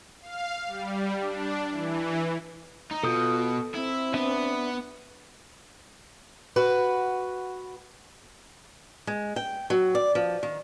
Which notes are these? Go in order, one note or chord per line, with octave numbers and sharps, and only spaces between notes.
F5
G3
D4
E3
D#4
B2 F4 A4 D#6 G6
C4 E4
B3 D4 B4 E5
F#4 B4
G#3
G5
F#3
D5
F3
D#3